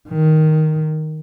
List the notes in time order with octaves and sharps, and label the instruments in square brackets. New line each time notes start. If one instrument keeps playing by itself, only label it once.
[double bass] D#3